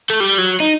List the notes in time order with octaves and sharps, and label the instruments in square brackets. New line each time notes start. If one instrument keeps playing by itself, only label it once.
[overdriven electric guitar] A3
G3
F#3
D#4